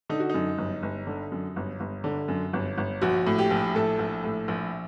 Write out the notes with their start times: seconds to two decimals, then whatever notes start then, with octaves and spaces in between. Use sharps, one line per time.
0.09 D3 D#4
0.20 F#4
0.30 F#2 D#4
0.58 G1
0.83 G1
1.07 D3
1.32 F#2
1.56 G1
1.80 G1
2.04 D3
2.28 F#2
2.53 G1
2.78 G1
3.01 A#1 F#4
3.27 A2
3.38 G4
3.51 A#1
3.75 A2 A4
3.99 A#1
4.24 A2
4.48 A#1